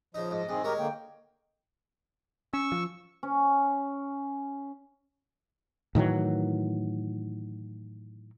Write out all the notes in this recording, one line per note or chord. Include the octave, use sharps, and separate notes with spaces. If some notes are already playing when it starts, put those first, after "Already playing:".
C#3 F3 D#4 D#5
G#2 D#5
G2 D#3 C4 G#4
G#3 G4 A#4 C#5
D3 A#3 G5
C#4 C#6 E6
F3
C#4
A2 D#3 E3 F#3